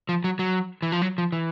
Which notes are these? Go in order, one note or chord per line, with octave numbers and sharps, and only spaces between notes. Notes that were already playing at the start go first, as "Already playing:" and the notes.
F3
F#3
F#3
E3
F3
F#3
F3
E3